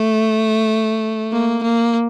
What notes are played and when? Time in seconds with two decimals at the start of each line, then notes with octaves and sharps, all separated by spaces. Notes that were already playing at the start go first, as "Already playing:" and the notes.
Already playing: A3
1.32 A#3
1.63 A#3